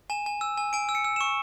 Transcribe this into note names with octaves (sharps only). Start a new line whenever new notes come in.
G#5 E7
G#5
E6
G#5
G#5 D7
E6
C#7
E6
C#6 E7